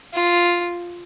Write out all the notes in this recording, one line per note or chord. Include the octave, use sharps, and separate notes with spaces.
F4